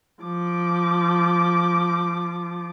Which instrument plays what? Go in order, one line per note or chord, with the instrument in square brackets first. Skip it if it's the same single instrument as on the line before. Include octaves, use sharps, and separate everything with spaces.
[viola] F3 D6